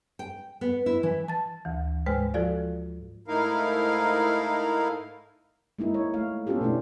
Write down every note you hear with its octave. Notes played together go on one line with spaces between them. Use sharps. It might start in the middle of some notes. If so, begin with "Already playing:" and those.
G5
B3
E4
E3
A5 A6
D2 E3
G#2 G#3 B4 C5 G5 F6
F3 F4 F#4 A4 D5 F5
G#2 A3 D#4 E4 A#4 F5
G#3 A#3 D#4 E4
C#5
A3 F5
B3 C#4 F4 G4 A4
B2 A3 C#4 D4 E4